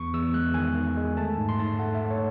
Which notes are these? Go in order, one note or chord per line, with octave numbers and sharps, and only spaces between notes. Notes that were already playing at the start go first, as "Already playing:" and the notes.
Already playing: E2 C#6
E2 E6
G#3 F#6
D#3 G#5
D#3
G#3
A3 A5
G#2
C6
G#2 A5
A3 F#5
E5
A3
C#5